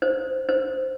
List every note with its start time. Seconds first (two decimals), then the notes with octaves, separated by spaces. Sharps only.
0.02 C5
0.49 C5